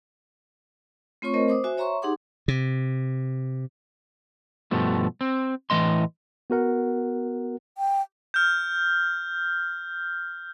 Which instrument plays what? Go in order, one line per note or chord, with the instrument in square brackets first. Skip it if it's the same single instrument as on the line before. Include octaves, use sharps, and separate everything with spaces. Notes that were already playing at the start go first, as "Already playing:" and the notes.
[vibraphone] A3 C4 F4 C#5 C#6
A3 C4 A#4 C5 D#5
C5 D6 D#6
F#4 C5 E5 G#5
C#5 E5 A#5 C6 C#6
D#4 G4 G#4 F#5 C6 D6
[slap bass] C3
[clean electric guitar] G2 B2 F3 A3
C4
A2 E3 B3 D#5 C6
[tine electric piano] B3 F#4 A#4 F#5
[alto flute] G5
[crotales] F6 G6